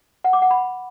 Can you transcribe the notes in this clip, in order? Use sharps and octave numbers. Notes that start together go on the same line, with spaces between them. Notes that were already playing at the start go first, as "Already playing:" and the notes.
F#5
D6
F#5
B5